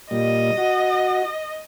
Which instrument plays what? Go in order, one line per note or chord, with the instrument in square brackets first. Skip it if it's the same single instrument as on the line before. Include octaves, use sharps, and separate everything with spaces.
[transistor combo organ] A#2 G3 [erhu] D#5
[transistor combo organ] F#4